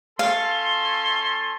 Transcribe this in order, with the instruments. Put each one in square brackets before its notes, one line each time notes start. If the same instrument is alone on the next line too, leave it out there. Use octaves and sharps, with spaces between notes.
[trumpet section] C#4 A4 C6 [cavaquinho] F5